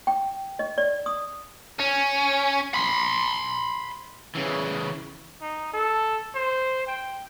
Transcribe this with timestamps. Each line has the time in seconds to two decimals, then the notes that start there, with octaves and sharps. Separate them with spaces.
0.07 G5
0.59 D#5
0.78 D5
1.06 D#6
1.79 C#4
2.74 B5 C6
4.35 C#3 E3
5.41 D#4
5.74 A4
6.35 C5
6.87 G5